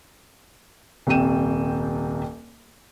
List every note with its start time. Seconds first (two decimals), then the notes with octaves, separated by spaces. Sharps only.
1.07 D#1 C2 C3 G5 D#7 E7